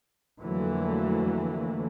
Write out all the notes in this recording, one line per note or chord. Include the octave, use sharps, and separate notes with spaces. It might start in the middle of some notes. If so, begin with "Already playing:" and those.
F2 D3 E3 F#3 A3 A#3